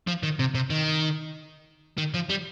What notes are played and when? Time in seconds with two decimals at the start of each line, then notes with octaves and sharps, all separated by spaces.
0.07 F3
0.23 D#3
0.39 C3
0.55 C3
0.70 D#3
1.98 D#3
2.14 F3
2.29 G3